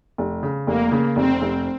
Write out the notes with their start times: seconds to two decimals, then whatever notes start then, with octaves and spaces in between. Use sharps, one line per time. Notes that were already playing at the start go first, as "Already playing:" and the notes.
0.18 F1
0.43 C#3
0.67 F1 A#3
0.92 C#3
1.16 F1 C4
1.41 F1